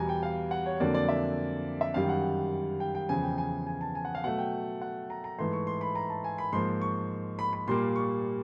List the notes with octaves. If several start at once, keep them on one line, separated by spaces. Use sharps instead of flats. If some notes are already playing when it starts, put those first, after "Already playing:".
Already playing: E2 B2 G3 G#5 A#5
G5
F5
F#5
C#5
F2 D3 F#3 A#3 D5
D5
E5
E5
F#2 D#3 G3 F5
F#5
G5
G5
E2 C#3 F3 G#5
G5
G#5
G#5
A5
G#5
F#5
F5
B2 F#3 A3 F#5
G5
F#5
A#5
A#5
G#2 E3 A3 C6
C#6
C6
B5
A#5
A5
G#5
B5
G#2 F3 A#3 C6
C#6
B5
B5
A#2 G3 A#3 C6
C#6